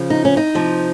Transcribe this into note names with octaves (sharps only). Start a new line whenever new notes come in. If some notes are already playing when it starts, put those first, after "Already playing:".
Already playing: C#3 F3
D#4
C#4
D#4
C3 F3